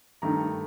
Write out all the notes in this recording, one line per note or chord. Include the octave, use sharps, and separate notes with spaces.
G2 D#3 A3 A#5